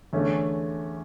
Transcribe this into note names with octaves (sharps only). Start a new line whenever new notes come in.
E2 D3 A3 C#4